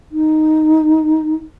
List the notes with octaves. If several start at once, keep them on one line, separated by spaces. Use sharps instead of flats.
D#4